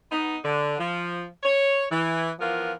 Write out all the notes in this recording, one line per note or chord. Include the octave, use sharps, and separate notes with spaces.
B3 D#4
D3
F3
C#5
E3
E3 F3 B3 F4 A#4